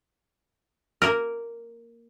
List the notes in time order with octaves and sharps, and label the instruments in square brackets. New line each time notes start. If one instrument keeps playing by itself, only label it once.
[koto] A#3 A#4